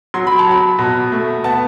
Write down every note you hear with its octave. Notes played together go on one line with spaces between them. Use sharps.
F#3 C6
B5
A5
F#3 B5
B2
A3
B3 A5